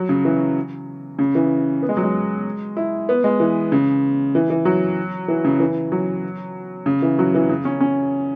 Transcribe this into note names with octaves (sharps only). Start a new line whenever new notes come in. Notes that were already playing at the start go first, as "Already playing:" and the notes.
Already playing: F#3
C#3
E3
C#3
E3
B3
G#3
F#3
G#3
E4
B3
G#3
E3
C#3
E3
E3
F#3
E3
C#3
E3
F#3
C#3
E3
F#3
E3
C#3
C#4
C#4